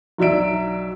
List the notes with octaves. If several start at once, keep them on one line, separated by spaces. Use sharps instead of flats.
B1 F#3 D4 E5 D7